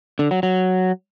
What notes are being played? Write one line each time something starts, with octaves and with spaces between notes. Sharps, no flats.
D3
F#3
F#3